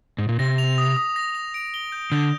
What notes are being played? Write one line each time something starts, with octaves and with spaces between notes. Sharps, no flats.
G#2
A#2
C3 A#6
F7
D#6
D#6
A#6
F7
D7
G7
G6
D3 G6